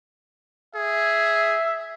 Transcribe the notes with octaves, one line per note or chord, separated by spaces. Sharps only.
G#4 E5